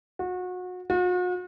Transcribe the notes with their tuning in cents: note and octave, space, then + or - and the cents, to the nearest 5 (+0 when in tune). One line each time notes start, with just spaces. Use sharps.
F#4 -30
F#4 -45